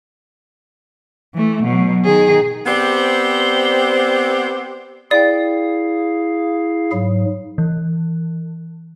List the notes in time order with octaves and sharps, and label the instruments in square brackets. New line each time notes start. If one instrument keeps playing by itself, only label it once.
[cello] E3 A3
B2 F#3
D#3 G#4
[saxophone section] B3 C4 G4 C5 D5
[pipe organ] E4 G#4 F5 [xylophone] D5 G5
[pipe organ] G#2 F#3
[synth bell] E3